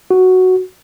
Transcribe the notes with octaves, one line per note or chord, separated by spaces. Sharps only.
F#4